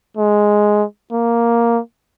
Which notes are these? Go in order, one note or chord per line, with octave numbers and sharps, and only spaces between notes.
G#3
A#3